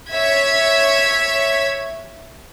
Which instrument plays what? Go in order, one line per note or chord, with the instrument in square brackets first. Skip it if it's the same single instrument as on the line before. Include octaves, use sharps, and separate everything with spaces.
[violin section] C#5 E5 G#6 B6